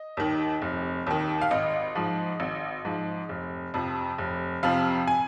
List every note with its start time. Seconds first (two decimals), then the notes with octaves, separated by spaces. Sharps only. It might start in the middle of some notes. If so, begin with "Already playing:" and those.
Already playing: D#5
0.17 D#2 D#3
0.62 F1
1.07 D#2 D#3
1.42 F5
1.51 G#1 D#5
1.95 G#2 F3
2.40 G#1
2.85 G#2 F3
3.29 F1
3.74 F2 C3 F3
4.18 F1
4.63 F2 C3 F3 F5
5.08 G#5